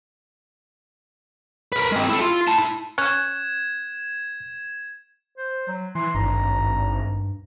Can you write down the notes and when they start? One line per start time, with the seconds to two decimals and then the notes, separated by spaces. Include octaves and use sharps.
1.72 A#4 B4
1.92 G#3 C4
2.09 E4 A4
2.21 F4
2.48 E4 A5
2.98 C#4 F#6 G#6 E7
5.38 C5
5.68 F#3
5.95 E3 C6
6.15 G#1 G2 A#5